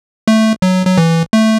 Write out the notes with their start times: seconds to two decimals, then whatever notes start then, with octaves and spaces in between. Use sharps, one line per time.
0.28 A3
0.62 F#3
0.87 F#3
0.98 E3
1.33 A3